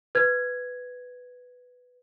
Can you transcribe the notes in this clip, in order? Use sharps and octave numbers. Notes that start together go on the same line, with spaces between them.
B4 G#6